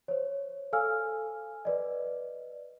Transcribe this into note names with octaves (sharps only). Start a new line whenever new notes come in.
C5 C#5
A4 F5 G#5 E6 F6
B4 D5 D#5